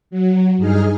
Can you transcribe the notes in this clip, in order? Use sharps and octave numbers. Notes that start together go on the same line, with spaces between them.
F#3
G2 D#4 G#4 F6